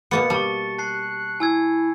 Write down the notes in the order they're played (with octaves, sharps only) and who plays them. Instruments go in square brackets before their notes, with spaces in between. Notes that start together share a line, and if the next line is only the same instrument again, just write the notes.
[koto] B2 A#3 B3 [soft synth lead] A6 [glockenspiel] C#7
[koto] G3 [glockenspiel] A5 C#6
[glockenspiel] A5 C7 [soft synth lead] F#6
[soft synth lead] E4 [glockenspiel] G#5 E6 G#6